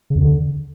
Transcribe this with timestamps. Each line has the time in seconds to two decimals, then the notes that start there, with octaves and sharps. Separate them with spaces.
0.10 C#3
0.15 E2
0.21 D3